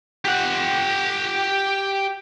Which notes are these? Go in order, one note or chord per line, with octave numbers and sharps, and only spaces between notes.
G4 F#5